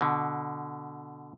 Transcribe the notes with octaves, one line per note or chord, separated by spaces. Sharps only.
B2 D3